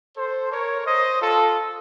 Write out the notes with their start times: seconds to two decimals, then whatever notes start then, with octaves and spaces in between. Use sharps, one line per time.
0.16 A4 C5
0.51 A#4 C#5
0.86 C5 D#5
1.21 F4 A4